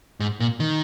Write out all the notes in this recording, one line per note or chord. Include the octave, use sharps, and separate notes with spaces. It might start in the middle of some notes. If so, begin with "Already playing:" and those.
G#2
A#2
D#3